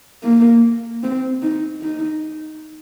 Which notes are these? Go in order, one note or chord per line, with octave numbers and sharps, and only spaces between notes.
A#3
C4
D#4
D#4